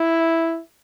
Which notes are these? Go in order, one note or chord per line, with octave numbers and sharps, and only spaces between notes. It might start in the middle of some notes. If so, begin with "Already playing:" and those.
Already playing: E4